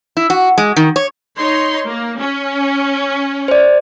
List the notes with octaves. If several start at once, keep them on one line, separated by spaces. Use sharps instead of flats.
E4
F#4
G#3
D#3
C#5
D#4 C#5 C6
A#3
C#4
C5 D5